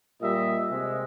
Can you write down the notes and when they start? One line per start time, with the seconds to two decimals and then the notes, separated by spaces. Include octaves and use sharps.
0.20 A#2 G3 D#5 E5
0.69 C3 G#3